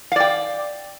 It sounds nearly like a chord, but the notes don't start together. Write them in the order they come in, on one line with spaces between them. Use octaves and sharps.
F5 D5 G5